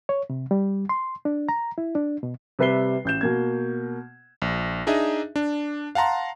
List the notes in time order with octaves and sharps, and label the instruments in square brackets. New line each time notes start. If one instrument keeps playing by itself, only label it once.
[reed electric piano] C#5
C3
G3
C6
D4
A#5
E4
D4
B2
[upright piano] C3 G3 B4 E5 C7 G7
A1 G6 E7
B2 A#3 G#6
[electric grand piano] A#1
D4 D#4 G#4 D#5 E5
D4
F5 F#5 A5 A#5 C6